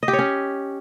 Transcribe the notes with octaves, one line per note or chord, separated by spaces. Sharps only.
D#5
G4
C#5
C#4